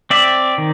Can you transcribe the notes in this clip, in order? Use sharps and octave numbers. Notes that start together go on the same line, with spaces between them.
C4 D5 E5
D#3